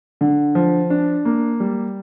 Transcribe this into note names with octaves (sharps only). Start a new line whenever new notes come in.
D3
F3
D4
A#3
G3